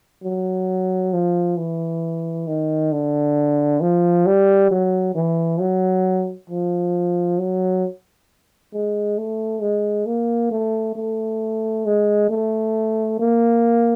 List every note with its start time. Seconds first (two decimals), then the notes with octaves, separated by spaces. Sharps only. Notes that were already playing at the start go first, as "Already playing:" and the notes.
0.24 F#3
1.13 F3
1.58 E3
2.47 D#3
2.92 D3
3.81 F3
4.26 G3
4.71 F#3
5.15 E3
5.60 F#3
6.50 F3
7.39 F#3
8.73 G#3
9.18 A3
9.61 G#3
10.06 A#3
10.52 A3
10.96 A3
11.86 G#3
12.30 A3
13.19 A#3